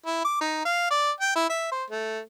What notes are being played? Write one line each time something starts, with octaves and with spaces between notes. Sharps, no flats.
E4
D6
D#4
F5
D5
G5
E4
E5
C5
A3